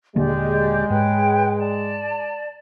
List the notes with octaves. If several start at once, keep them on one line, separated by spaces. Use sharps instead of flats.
D#1 D3 G#3 A#3 G4 D5
G#2 B4 C#5 G5
D5 A5